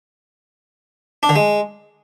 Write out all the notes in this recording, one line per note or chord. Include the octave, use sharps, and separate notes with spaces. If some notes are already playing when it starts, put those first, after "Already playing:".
D4
D3
G#3